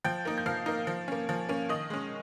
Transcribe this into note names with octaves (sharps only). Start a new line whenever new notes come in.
F3 G5 G6
A#3 D#4
G6
F3 F5 F6
A#3 D#4
F3
A#3 C#4
F3
A#3 C#4
D#3 D#5 D#6
G#3 C#4